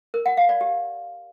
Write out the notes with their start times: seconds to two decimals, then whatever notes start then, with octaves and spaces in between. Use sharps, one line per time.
0.14 A#4
0.26 F#5
0.37 F5
0.49 D5
0.61 G4